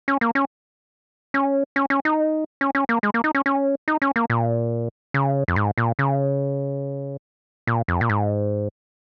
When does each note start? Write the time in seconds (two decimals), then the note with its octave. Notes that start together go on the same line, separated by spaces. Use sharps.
0.08 C#4
0.21 A#3
0.35 C#4
1.34 C#4
1.76 C#4
1.90 C#4
2.05 D#4
2.61 C#4
2.75 C#4
2.89 A#3
3.03 G#3
3.14 A#3
3.24 D#4
3.35 C#4
3.46 C#4
3.88 D#4
4.02 C#4
4.16 A#3
4.30 A#2
5.14 C#3
5.48 F2
5.56 G#2
5.78 A#2
5.99 C#3
7.67 A#2
7.88 F2
8.01 A#2
8.09 G#2